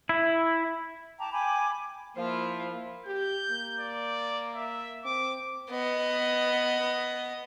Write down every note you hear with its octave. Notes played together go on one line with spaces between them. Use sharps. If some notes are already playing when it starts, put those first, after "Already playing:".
E4
G5 A5 A#5 D6
G5 G#5 B5 D6
F3 A#3 E4 F4
G4 G6
A#3
D5
E5
C4 D6
B3 D#5